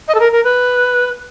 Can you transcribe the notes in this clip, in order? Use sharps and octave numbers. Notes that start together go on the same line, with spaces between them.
D#5
A4
A#4
A#4
B4